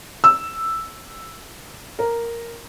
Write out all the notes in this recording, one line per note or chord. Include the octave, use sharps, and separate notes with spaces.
E6
A#4